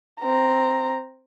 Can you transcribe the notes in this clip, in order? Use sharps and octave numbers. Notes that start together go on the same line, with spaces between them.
C4 A#5